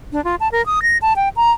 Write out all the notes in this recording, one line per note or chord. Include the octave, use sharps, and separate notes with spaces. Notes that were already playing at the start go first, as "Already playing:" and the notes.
D4
F4
A5
A#4
D#6
A#6
A5
G5
A#5